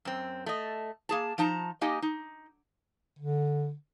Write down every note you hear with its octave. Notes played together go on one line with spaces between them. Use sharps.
F#2 C4
A3 D#5
A#3 G#4 A5
F3 D#4 A5 A#5
A#3 D#4 G4 D#5 G#5
D#4
D3